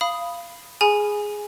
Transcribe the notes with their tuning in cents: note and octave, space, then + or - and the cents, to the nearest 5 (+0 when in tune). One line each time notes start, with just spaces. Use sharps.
F5 -15 B5 +0 D#6 +0
G#4 +0 G#5 +0 B5 +0